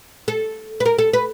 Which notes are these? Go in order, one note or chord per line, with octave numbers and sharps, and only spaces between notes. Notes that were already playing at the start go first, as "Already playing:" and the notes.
A4
B4
A#4
A4
B4